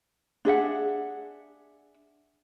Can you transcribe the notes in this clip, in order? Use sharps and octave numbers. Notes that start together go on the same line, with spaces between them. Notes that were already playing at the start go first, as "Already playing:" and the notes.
D4 G#4 E5 F#5